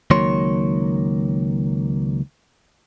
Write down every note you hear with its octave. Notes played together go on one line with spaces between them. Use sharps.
C#2 D#3 F#3 A#3 C#5 C6